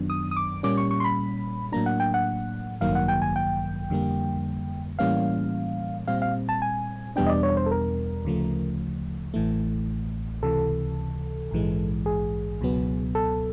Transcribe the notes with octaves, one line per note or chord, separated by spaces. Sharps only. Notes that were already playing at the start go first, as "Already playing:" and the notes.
Already playing: F#2 D#3 F#3 B3 D4
D#6
D#6
D6
A#2 G3 A#3 C#4 D6
C#6
C#6
C6
B5
A2 F#3 A#3 D4 A#5
F#5
G5
F#5
A1 G2 D#3 F#3 A#3 F5
F#5
G5
G#5
G5
F2 D3 G3 A#3
A2 E3 G3 A#3 C#4 F5
A#2 G3 C4 F5
F5
A5
G#5
E2 B2 G3 B3 D4 G5
D#5
D5
C#5
C5
A4
A#4
D2 C#3 F3 A3
A1 A2 E3 A3
C#2 C3 E3 A4
A#1 G#2 E3 G#3
G#4
C#2 B2 F#3 B3
A4